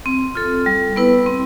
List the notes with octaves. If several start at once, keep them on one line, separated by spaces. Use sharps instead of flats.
C4
F4 A4
G3
B3 E4 B4
C4